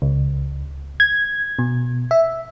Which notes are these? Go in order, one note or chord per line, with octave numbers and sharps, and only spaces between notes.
C#2
G#6
B2
E5